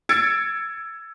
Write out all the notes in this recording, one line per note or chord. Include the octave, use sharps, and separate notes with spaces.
E6 G#6 A6 C#7 D7